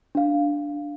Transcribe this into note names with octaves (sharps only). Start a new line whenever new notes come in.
D4 F5